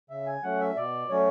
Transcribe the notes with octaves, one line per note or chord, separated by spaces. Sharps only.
C#3 E5
G#5
F#3 A3 C#4 F#5
E5
B2 D5
F#3 A3 C#4 C#5